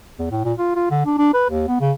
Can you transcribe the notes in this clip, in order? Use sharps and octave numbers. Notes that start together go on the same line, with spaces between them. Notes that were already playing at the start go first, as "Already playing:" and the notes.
E2
A2
A#2
F4
F4
D3
D4
D4
B4
D#2
B3
C#3